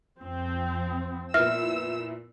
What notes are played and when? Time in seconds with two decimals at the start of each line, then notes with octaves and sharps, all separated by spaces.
0.21 F2 F3 C4
1.34 A#2 B3 E4 E5 E6 F6